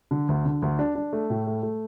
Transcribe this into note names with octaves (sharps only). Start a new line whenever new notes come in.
D3
D2
D3
D2
D4
D4
A3
A2
A3
A3